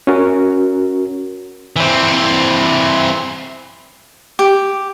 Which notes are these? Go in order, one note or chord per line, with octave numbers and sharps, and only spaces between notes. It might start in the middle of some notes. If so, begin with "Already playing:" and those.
C#4 F#4 A#4
E3 C4
G4